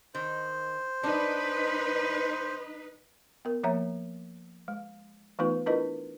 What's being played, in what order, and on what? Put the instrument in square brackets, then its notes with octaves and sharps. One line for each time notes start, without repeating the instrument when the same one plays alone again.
[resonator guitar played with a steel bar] D#3 [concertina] C5
[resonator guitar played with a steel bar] D4 [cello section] D#4 B4
[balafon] B3 A#4
F3 A#3 C#5 E5 A#5
G#3
E3 A3 B3 D#4 F4 B4
D4 E4 F4 A#4 B4 D#5